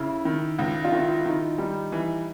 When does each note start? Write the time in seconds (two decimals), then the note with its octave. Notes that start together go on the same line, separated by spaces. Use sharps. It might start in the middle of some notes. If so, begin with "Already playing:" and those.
Already playing: C#3 E4
0.25 D#3
0.59 C#2
0.84 F4
0.92 D#3 E4
1.26 D#3 D#4
1.58 G3 D#4
1.92 E3